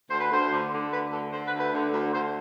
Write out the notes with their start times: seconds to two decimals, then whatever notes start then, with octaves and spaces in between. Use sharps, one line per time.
0.09 D2 C5
0.20 B4
0.31 D2 C5
0.51 D3
0.72 D3
0.92 D2 B4
1.12 D3 A4
1.32 D3 C5
1.46 B4
1.52 D2
1.59 B4
1.73 D3
1.93 D2
2.13 D2 C5